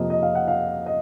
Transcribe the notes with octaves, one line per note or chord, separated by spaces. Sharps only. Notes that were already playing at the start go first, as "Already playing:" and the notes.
Already playing: F2 C3 F3 A#3 D#5
D#5
F5
F#5
F5
D#5